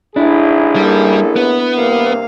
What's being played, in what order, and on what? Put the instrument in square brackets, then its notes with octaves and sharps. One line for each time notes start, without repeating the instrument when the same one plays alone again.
[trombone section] A1 G#2 G#4 [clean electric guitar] D4 E4
[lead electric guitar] G3 [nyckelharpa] A#3 A4
[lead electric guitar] B3 [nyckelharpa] B4
[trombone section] G2 C3 [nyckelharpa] A#3 F5